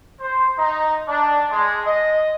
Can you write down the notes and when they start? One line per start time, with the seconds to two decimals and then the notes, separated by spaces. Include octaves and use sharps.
0.19 C5
0.57 D#4
1.07 D4
1.49 G#3
1.85 D#5